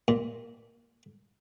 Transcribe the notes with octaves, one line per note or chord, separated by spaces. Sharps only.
A#2